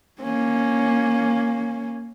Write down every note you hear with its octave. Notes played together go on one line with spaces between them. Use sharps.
A#3 C#4